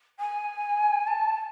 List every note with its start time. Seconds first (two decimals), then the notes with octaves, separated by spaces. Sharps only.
0.19 G#5
1.06 A5